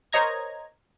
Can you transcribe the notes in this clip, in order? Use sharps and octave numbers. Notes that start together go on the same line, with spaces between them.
A#4 C5 C#5 D#5 A#5 G#6